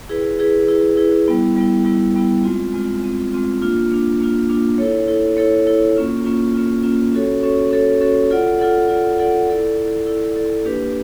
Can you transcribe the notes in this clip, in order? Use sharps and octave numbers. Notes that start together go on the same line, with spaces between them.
E4 G#4 B4
E4 G#4 B4
E4 G#4 B4
E4 G#4 B4
G3 B3 E4
G3 B3 E4
G3 B3 E4
G3 B3 E4
G#3 C4 F4
G#3 C4 F4
G#3 C4 F4
G#3 C4 F4
A#3 D4 F4
A#3 D4 F4
A#3 D4 F4
A#3 D4 F4
E4 A4 C#5
E4 A4 C#5
E4 A4 C#5
E4 A4 C#5
A#3 C#4 F4
A#3 C#4 F4
A#3 C#4 F4
A#3 C#4 F4
C#4 F#4 A4 C#5
C#4 F#4 A4 C#5
C#4 F#4 A4 C#5
C#4 F#4 A4 C#5
F4 A4 D5 F#5
F4 A4 D5 F#5
F4 A4 D5 F#5
F4 A4 D5 F#5
E4 A4 D5
E4 A4 D5
E4 A4 D5
E4 A4 D5
A#3 D4 G4 B4